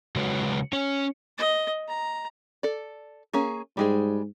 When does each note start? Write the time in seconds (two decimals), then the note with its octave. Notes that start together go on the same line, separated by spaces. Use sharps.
0.16 C#3 F#3 G#3 F#4 B4 C#5
0.73 C#4 C#5
1.38 D#5
1.88 A#5
2.63 A4 D5
3.33 A#3 C#4 G#4
3.77 G#2 G3 G#3 G#4